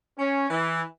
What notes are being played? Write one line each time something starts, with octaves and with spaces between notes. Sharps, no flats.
C#4
E3